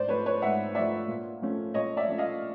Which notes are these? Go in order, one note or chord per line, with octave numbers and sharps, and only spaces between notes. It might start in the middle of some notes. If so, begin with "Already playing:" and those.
Already playing: G#2 C5 D5
F3 A3 B4 C#5
B4 C#5
G#2 E5 F#5
F3 A3 D5 E5
A#2
F3 A3 C#4
A#2 C#5 D#5
D5 E5
F3 A3 C#4
D#5 F5